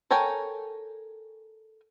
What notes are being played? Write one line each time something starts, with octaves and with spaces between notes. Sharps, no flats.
A4 A#4 C#5 G5 G#5